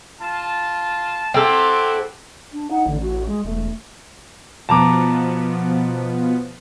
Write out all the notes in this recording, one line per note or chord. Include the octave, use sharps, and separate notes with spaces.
F4 A5
C4 E4 F#4 G4 A4
D4
D#4 F#5
A1 D3
F#4
G#3
E1 A3
B2 F3 B3 A5 A#5 D6